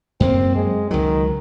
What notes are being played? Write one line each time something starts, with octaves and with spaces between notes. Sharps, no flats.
F#2 A#3 C4
G#3
C#2 D#3 F#3